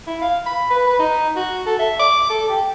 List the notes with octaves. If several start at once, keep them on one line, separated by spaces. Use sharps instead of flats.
E4
F5
B5
B4
B4
D#4
F#4
A4
E5
D6
A4
G4